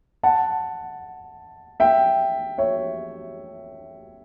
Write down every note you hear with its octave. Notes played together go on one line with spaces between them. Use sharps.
F#5 A5
E5 G5
C#5 E5